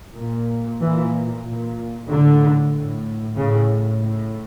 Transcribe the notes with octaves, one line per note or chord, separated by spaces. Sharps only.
A#2
A#2 E3
A#2
A2 D3
A2
A2 C#3
A2